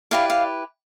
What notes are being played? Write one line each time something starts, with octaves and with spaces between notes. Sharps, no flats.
E4 G4 B4 D5 F5
F5